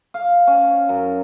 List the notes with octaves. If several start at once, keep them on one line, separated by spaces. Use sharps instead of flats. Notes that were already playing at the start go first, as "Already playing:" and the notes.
F5
C#4
F#2